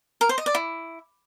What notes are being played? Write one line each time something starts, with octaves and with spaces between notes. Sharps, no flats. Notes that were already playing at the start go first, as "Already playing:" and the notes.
A#4
C5
D#5
D5
E4